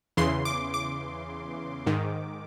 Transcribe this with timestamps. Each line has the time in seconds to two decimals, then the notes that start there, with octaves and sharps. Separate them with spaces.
0.17 E2 C#3 E3 C6
0.45 D6
0.74 D6
1.87 G#2 D#3